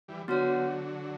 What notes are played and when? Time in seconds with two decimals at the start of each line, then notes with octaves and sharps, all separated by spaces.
0.08 E3 G3
0.28 D3 F#3 B3 F#4 C#5 F#5